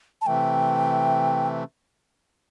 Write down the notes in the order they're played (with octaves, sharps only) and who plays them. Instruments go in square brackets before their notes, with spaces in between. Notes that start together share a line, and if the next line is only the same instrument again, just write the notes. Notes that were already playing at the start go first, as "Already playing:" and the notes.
[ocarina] A5
[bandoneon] C3 E3 A3 [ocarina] G5